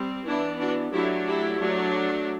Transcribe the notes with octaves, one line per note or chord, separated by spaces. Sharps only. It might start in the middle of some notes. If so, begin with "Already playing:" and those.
Already playing: G3 C4
E3 B3 D4 E4
D4 F#4
F#3 A3 D4 E4 G4
E4 G4
F#3 A3 D4